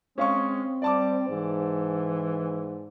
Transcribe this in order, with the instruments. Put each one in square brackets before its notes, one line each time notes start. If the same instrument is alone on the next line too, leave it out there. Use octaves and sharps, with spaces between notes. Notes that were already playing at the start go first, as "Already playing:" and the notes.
[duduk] G#3 [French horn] C4 [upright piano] C#4 F5 C#6
[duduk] G3 [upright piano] D5 A5 D6
[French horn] G#2 [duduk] E3